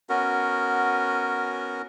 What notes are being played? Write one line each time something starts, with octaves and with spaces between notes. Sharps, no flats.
B3 C#4 F#4 A#4